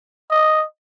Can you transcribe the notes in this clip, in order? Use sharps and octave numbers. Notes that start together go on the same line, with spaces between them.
D#5